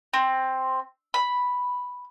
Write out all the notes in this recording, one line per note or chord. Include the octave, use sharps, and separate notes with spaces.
C4
B5